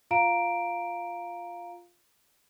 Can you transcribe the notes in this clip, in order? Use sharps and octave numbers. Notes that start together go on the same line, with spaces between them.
F4 F5 A#5 D7